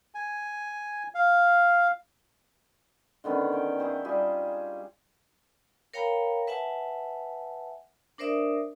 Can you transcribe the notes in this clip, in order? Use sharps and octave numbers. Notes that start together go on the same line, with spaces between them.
G#5
F5
D3 D#3 B3 C#4
C#5 G5
E4 G#4 C5 F#5
G3 F4 G4 G#4
A#4 C#5 F5 G5 A#5 B5
B4 E5 F#5 G#5 A5
D4 A#4 C5 D5 E5 D#6